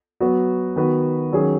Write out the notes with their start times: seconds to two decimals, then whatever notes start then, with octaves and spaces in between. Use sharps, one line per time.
0.20 F#3 B3 F#4 B4
0.76 D#3 B3 F#4 B4
1.32 D#3 F#3 C#4 G#4